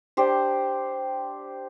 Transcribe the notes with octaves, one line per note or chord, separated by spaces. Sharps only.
D4 G4 C5